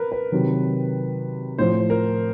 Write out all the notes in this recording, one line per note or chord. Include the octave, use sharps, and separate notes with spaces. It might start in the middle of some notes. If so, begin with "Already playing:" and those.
Already playing: A#4 B4
B4
C3 D#3 F#3
A2 F3 C5
A#4